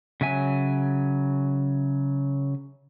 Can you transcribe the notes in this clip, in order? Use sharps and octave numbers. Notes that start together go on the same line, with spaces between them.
C#3 F#3 E5 G#5